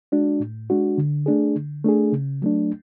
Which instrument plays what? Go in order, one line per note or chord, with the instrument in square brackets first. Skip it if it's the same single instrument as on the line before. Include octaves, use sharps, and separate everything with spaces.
[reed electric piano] G#3 D4 F#4
A2
G#3 D4 F#4
D3
A3 D4 G#4
D3
A3 D4 G#4
C#3
F#3 A3 D4